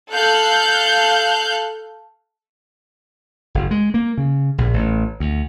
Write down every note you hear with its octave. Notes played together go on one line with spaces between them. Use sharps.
A4 F5 F#6 G6
F#1
G#3
A#3
C#3
A#1
A1
D2